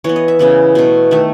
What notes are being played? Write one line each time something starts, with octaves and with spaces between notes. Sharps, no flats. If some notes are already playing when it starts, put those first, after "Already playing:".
E3 B3 C#5
D#5
E5
C#3 E3 B3
B2 A3
D#3 A3 E5